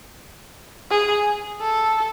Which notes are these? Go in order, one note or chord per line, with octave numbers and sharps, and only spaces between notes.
G#4
A4